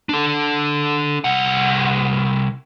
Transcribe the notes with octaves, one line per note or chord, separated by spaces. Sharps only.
D4 A4
C2 F#5